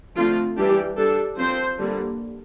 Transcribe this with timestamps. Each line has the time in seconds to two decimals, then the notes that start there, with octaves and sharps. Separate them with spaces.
0.17 D3 F3 A3 C4 F4
0.57 E3 G3 D4 G4
0.98 G3 D4 A4
1.38 F3 C4 C5
1.79 D3 G3 A#3